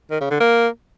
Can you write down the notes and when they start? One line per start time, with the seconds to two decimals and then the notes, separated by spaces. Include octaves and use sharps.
0.11 D#3
0.21 C#3
0.30 D3
0.40 A#3